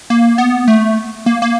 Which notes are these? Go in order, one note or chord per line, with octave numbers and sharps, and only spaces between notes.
A#3
B3
A3
A#3
A#3